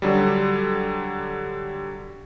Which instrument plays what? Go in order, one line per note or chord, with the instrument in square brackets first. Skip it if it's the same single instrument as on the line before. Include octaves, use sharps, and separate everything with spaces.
[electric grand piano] D3 F#3 G3